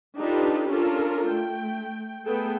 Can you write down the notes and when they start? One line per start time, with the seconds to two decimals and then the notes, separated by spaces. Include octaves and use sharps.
0.19 D4 D#4 F4 G4 A4 B4
0.69 C#4 D4 F4 A4 A#4
1.32 A3 G5
2.26 A3 B3 G#4 A4 G5